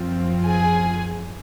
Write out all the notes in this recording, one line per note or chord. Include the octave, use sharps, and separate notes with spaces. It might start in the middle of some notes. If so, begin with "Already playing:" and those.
Already playing: F#2 F3 C4 F4
G#4 G#5